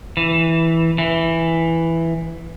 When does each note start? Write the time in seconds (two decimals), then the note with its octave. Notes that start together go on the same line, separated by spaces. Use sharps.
0.17 E3
0.98 E3